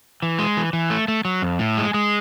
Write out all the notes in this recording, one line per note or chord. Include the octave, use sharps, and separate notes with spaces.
E3
G#3
E3
E3
A3
A3
F#3
F2
A2
G#3
G#3